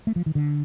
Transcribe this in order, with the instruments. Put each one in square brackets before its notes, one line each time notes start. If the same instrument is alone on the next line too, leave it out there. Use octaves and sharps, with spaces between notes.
[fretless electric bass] A3
F3
D#3
D3